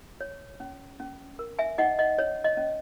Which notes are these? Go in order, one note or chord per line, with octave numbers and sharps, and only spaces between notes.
C#5
C#4
C#4
A#4
E5 G#5
D#4 D#5 F#5
D#5
C#4 C#5
D#5
C#4